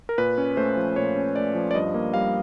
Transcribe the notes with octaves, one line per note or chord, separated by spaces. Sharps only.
A#4
A#2 B4
C#4
A3 C5
F3
A#2 C#5
C#4
A3 D5
F3
D5
G2 D#5
A#3
G3 F5